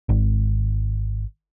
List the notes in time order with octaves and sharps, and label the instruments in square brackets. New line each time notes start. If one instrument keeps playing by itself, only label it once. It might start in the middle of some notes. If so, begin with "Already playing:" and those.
[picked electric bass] G#1